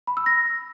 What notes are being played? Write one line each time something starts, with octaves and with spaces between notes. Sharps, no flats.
B5
E6
A#6